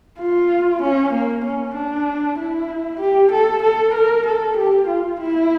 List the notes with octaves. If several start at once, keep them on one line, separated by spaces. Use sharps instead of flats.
F4
C#4
A#3
C#4
D4
E4
G4
A4
A4
A#4
A4
G4
F4
E4